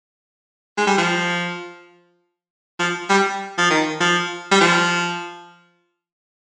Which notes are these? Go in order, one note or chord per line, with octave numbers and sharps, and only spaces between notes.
G#3
G3
F3
F3
G3
F3
D#3
F3
G3
F3